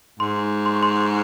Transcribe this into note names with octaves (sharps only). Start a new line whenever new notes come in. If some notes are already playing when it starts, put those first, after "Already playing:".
G#2 C6
C6
C#6
C6